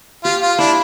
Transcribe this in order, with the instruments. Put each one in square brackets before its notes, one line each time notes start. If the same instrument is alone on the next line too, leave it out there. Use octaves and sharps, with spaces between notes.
[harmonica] F4 [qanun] G4
[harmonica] F4
[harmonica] D4 [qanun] E4